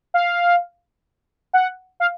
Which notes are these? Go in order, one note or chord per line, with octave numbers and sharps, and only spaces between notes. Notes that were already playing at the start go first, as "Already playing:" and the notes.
F5
F#5
F5